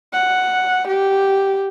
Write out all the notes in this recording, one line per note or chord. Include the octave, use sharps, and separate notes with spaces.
F#5
G4